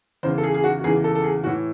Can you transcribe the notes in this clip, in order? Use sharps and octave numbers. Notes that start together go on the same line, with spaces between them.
E2 C#3 E3 C5
A4
G#4
G#4
F#4
F#4
E2 C#3 E3 G#4
A4
A4
G#4
A2 E3 F#4